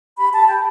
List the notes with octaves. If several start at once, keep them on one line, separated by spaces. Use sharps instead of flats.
G4 B5
G4 A5
G4 G5